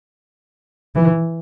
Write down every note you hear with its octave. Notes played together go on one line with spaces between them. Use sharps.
E3